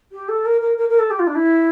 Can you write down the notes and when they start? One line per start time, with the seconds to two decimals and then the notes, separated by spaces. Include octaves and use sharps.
0.12 G4
0.29 A4
0.45 A#4
0.61 A#4
0.78 A#4
0.89 A#4
0.99 A4
1.11 G4
1.19 F4
1.27 D4
1.35 E4